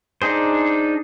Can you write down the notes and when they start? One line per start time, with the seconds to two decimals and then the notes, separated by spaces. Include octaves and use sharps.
0.22 D4 D#4 G#4 C5